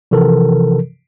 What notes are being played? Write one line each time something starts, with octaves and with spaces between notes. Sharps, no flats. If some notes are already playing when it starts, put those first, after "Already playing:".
C3 E3 F3 A4 A#4